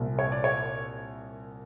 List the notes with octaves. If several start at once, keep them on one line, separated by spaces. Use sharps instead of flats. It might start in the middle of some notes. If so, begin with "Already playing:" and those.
Already playing: C2 A#2
C#5
D5
C#5